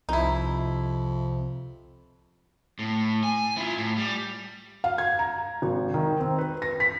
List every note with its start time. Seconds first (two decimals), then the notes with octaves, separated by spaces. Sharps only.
0.09 C2 F2 C3 D#4 E4
2.79 A2
3.23 G#5
3.57 E4 F4
3.78 A2
3.97 G3
4.84 F5
4.98 G#6
5.19 A#5
5.62 G#1
5.94 D#3
6.20 C4
6.39 B4
6.62 A#6
6.80 B6